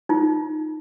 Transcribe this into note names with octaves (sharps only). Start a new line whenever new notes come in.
D#4 F4